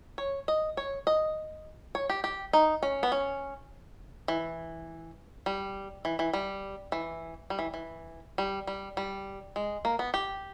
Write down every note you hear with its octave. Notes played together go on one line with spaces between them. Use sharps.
C#5
D#5
C#5
D#5
C#5
G4
G4
D#4
C#4
B3
C#4
E3
G3
E3
E3
G3
E3
G3
E3
E3
G3
G3
G3
G#3
A#3
B3
G4